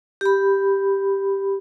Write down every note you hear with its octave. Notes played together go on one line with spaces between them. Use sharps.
G4 B5